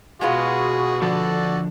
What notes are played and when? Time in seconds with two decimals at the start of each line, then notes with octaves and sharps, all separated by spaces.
0.21 B2 G#3 B3 F4 F#4 G#4
1.02 D3 F3 D4 F#4 A4 D5